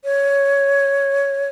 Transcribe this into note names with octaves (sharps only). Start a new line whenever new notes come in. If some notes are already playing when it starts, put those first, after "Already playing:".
C#5